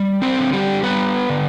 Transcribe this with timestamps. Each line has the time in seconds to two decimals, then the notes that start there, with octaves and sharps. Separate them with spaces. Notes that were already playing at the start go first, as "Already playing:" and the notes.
Already playing: G3
0.22 C4 C5
0.38 D3
0.53 G3 G4
0.83 G3 B3 B4
1.30 D3